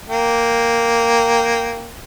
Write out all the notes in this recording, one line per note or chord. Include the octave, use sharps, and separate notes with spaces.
A#3 G5